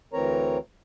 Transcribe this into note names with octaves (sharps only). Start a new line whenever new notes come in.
D2 E3 C4 A#4 C#5 A#5